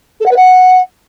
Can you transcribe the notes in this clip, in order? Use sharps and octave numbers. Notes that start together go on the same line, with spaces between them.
A4
F#5
B4
F#5